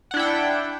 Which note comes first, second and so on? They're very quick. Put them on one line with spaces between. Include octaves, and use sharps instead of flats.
F#5 D4 E4 G5